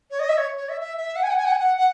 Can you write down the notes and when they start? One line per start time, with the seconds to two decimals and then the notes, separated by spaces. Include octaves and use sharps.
0.10 C#5
0.19 D#5
0.29 E5
0.37 C#5
0.57 C#5
0.69 E5
0.81 E5
0.97 E5
1.16 F#5
1.23 G#5
1.30 F#5
1.37 G#5
1.45 F#5
1.52 G#5
1.59 F#5
1.77 F#5